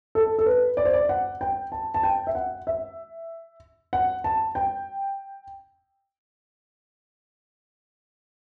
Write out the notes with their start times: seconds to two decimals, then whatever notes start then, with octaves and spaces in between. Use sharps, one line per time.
0.15 A4
0.39 A4
0.46 B4
0.77 D5
0.85 C5
0.93 D5
1.09 F#5
1.41 G5
1.72 A5
1.94 A5
2.03 G5
2.27 E5
2.35 F#5
2.67 E5
3.93 F#5
4.24 A5
4.55 G5